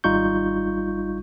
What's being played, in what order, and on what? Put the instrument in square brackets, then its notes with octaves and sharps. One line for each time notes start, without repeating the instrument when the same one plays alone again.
[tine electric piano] G#1 G3 D#4 F4 C#6 G6